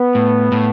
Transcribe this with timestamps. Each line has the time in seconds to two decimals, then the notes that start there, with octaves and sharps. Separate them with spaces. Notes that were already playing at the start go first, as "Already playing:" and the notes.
Already playing: B3
0.15 A2
0.52 A2